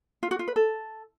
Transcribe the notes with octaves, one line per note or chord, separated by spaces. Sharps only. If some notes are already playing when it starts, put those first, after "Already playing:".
F4
F#4
F4
B4
A4